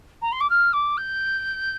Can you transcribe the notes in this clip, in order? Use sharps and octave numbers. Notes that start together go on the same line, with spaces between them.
A#5
C6
D6
F6
D6
G6